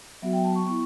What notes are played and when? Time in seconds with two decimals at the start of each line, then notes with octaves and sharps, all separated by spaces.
0.22 F#3 B3 F#4 E5
0.33 G5
0.44 A5
0.55 C#6
0.66 B3 E4 C#6